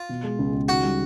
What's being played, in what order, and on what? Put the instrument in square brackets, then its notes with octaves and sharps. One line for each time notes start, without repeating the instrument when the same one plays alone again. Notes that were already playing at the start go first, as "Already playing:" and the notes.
Already playing: [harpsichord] F4
[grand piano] B2
G#3
C#2
C#2
[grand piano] D#3 [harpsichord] F#4
[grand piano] G3